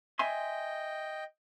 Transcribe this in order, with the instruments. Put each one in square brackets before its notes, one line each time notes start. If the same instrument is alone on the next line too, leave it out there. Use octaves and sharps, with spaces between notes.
[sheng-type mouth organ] D#5 G5 [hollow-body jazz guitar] E5 G#5 C6